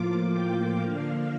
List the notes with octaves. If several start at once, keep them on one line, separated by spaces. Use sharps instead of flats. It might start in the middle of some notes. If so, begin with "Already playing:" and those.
Already playing: A2 F3 A#3 F4 D6
G5
D3 F3 A#3 D4 F5